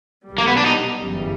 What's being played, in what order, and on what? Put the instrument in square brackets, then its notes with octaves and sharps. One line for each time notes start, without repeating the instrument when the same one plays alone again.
[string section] B1 B2 G3
[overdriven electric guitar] A#3
B3
D4
D#4
[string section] G1 F#2 C#3 E3 G3